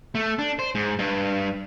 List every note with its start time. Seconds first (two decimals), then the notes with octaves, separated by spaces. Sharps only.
0.15 A3
0.39 D4
0.59 C5
0.75 G#2
0.99 G2